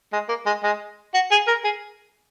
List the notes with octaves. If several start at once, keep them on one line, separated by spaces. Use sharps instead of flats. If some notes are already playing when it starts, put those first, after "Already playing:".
G#3
A#3
G#3
G#3
F#4
G#4
A#4
G#4